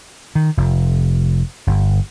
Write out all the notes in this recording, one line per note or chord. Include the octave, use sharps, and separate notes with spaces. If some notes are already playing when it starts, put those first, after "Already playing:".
D#3
F1
G1